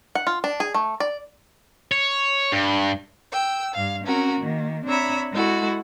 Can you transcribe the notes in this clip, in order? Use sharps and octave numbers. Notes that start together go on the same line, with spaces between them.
F#5
F4
D4
G#4
A3
D5
C#5
G2
G5 E6
G2 F5
C4 C#4 F#4 A#4
D#3 A#3
C4 D4 C#5 E5 A#5 B5
G#3 E4 F#4 A4